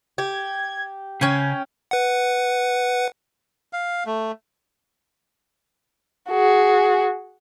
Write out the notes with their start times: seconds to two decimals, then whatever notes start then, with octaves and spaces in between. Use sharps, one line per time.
0.18 G4 G#6
1.21 C#3 C#4 G5 G#5
1.91 B4 F#5
3.73 F5
4.06 A3
6.30 F#4 G#4